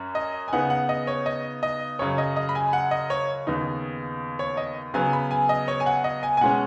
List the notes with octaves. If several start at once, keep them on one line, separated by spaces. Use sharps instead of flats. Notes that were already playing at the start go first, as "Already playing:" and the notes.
Already playing: F#2 C#4
D#5
G#5
C#3 B3 D#4 F#5
F#5
D#5
C#5
D#5
D#5
F#2 C#3 F#3 C#5
D#5
D#5
B5
G#5
F#5
D#5
C#5
D#2 C#3 B3 D#4
C#5
D#5
C#3 F#3 B3 G#5
B5
G#5
D#5
C#5
G#5
F#5
D#5
G#5
G#5
B2 G#3 C#4 F#5